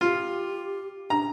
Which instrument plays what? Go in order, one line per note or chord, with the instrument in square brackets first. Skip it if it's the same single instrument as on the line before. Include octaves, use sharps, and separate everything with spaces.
[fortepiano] F4 [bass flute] G4
[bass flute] D4 [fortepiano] A#5